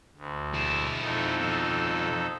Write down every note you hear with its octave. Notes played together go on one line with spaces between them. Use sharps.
D2
G#3 E4
F2 D#4 A4
B2 F3